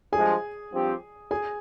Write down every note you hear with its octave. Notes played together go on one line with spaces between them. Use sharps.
G2 F3 G#3 G#4 G#5
G2 F3 C4 G4
G#4 G#5